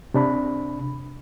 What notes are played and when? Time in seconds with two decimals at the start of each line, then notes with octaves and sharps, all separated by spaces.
0.14 C3 D4 B5